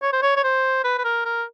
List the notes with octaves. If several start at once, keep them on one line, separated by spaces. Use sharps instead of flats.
C#5
C5
C#5
C#5
C5
B4
B4
A#4
A#4